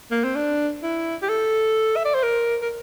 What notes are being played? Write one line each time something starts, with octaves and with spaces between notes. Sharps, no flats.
A#3
C4
D4
E4
G4
A4
E5
D5
C5
A#4
A#4